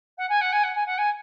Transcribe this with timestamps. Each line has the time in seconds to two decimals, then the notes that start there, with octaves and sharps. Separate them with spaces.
0.18 F#5
0.29 G#5
0.41 F#5
0.52 G#5
0.63 F#5
0.75 G#5
0.86 F#5
0.98 G#5